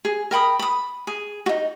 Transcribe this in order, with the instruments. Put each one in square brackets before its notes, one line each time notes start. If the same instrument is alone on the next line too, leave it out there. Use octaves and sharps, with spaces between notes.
[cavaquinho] G#4
A#4 G5 B5 D#6
B5 D#6
G#4
D#4 F#4